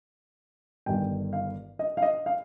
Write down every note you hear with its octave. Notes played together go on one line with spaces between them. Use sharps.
G1 G2 D#3 G5
F5
D#5
F5
D#5
F5